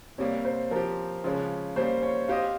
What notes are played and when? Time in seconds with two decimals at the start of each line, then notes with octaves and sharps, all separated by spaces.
0.18 C3 G3 A#3 C#5
0.45 C5
0.71 F3 C4 G4 A#4
1.24 C#3 F3 G#3 C#4
1.76 G3 A#3 C#4 C5
2.03 C#5
2.28 C4 G4 C5 D#5 F5